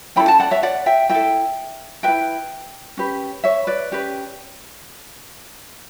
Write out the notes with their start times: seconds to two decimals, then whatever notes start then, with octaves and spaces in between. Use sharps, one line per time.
0.16 C#4 E4 A4 G5 B5
0.28 F#5 A5
0.40 D5 F#5
0.51 C#5 E5
0.63 D5 F#5
0.86 E5 G5
1.09 E4 A4 E5 G5
2.03 E4 B4 E5 G5
2.97 C#4 G4 B4
3.44 C#5 E5
3.67 B4 D5
3.91 C#4 G4 B4